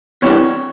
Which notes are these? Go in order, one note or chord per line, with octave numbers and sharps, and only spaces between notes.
E2 C3 E3 G3 C#5